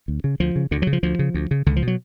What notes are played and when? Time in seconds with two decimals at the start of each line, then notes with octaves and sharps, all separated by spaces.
0.08 D2
0.24 C#3
0.40 D2 F3
0.56 C#3
0.71 D2 D3
0.82 F#3
0.87 C#3
0.93 F3
1.03 D2 F3
1.19 C#3
1.34 D2
1.51 C#3
1.66 C#2 D3
1.76 F3
1.82 B2
1.87 F#3